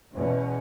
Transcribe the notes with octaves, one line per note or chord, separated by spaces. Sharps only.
E2 B2 C#4